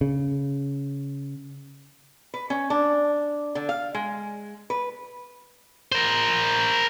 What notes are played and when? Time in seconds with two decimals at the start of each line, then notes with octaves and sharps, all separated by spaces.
0.01 C#3
2.34 B4
2.50 C#4
2.70 D4
3.55 D3
3.69 F5
3.94 G#3
4.70 B4
5.92 A#4 C5